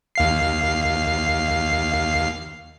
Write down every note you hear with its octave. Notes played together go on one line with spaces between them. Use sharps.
D#2 F5 C7